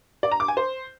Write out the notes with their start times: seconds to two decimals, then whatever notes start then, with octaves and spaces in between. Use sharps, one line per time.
0.23 D5
0.32 A#5
0.40 D6
0.48 G#5
0.57 C5